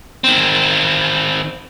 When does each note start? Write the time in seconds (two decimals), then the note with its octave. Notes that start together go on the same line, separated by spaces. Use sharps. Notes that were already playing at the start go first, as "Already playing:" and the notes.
0.24 D#3 C4